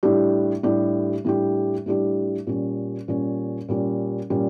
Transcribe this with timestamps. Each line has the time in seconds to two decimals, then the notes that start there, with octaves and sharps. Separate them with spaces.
0.03 A2 G3 D4 G4
0.63 A2 G3 D4 G4
1.25 A2 G3 D4 G4
1.86 A2 G3 D4 G4
2.47 A#2 G3 C#4
3.08 A#2 G3 C#4
3.68 A#2 G3 C#4
4.30 A#2 G3 C#4